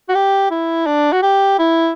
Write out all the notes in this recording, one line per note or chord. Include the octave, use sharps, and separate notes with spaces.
F#4
G4
E4
D4
F#4
G4
E4